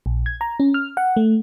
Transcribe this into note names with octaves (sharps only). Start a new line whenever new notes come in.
A#1
G#6
A#5
C#4
F6
F#5
A3